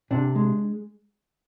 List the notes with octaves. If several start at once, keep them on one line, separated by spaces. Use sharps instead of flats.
C3 D4
G#3